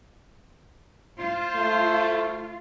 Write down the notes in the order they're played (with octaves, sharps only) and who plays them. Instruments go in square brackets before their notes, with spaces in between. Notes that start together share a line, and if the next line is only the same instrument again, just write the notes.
[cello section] F4 [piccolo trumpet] C5
[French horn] A3